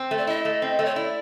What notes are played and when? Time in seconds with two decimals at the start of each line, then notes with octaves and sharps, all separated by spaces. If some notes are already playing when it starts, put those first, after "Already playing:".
Already playing: C4
0.11 A3
0.18 D5
0.27 E4 D#5
0.45 A3
0.62 C4
0.79 A3
0.85 C#5
0.96 E4 D5